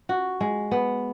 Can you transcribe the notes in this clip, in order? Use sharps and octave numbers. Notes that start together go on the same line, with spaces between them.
F#4
G#3
B3